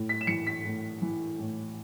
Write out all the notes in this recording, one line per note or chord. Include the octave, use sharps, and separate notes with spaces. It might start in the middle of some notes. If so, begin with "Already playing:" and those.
Already playing: A2
B6
E7
E3 C#7
B6
A2
E3
A2